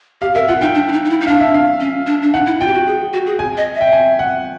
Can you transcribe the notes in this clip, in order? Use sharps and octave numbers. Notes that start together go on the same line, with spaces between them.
G4 F5
A#4 E5
F4 F#5
D#4 G5
D4
E4
D#4
D#4
E4
D#4
D4 F5
E5
F5
C#4
D4
D4
D#4 F#5
E4
F4 G5
G4
F#4
G#4
F#4
G#4
G#5
D#5
E5
G5
G#5
F#5